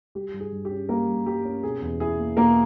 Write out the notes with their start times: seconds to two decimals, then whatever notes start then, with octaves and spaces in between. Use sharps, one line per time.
0.15 G3 G4
0.34 G2
0.40 G#4
0.52 G2
0.65 G4
0.71 C#4
0.89 G3 A#3 A#4
1.07 G2
1.26 G2 G4
1.45 C#4
1.63 B2 G#4
1.82 E2
2.00 E4 G#4
2.19 A#3
2.37 B2 A#3 A#4